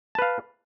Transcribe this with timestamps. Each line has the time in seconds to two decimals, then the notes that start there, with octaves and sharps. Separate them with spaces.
0.15 A5
0.19 B4
0.22 F5